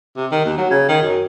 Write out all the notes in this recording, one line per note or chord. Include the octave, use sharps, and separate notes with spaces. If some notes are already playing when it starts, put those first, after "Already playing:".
C3
D#3
D#2
F#3
C#3
D#3
F#2